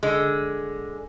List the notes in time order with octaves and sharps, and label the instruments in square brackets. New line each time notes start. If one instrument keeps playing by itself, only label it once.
[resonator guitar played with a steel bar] D3 G#3